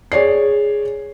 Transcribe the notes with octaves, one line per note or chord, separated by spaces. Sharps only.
G#4 C#5 D5 C7